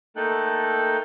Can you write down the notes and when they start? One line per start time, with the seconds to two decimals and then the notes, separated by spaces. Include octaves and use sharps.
0.16 A3 A#3 D#4 A4 G5 F#6